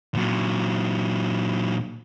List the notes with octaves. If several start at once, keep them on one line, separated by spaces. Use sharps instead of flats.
A#2 F#3